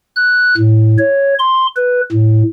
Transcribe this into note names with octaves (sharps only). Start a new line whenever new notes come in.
F#6
A2
C#5
C6
B4
A2